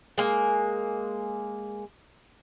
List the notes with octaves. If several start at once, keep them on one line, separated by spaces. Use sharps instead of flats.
G#3 A#3